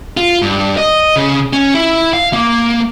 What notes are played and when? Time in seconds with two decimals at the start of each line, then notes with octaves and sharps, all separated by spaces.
0.17 F4
0.42 G2
0.77 D#5
1.16 C#3
1.53 C#4
1.75 E4
2.13 F5
2.33 A#3